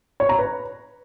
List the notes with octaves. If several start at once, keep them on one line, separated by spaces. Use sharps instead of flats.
C#5
A#5
B4